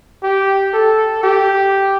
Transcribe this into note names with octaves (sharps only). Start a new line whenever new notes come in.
G4
A4
G4